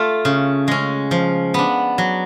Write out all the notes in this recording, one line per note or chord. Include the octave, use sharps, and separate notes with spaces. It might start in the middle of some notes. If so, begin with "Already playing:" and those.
Already playing: A3 F4
C#3
G#3 C#4
F3
B3 D4
F#3